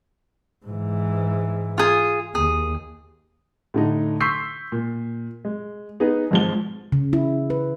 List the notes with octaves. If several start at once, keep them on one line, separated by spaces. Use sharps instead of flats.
G#2 E3
F4 G#4
D#2 G#4
A2 D3 D#4
C6 C#6 E6 G6 B6 C7
A#2
G#3
B3 D#4 G#4 B4
G#1 G#2 F3 G#3 G7
C#3
E4
B4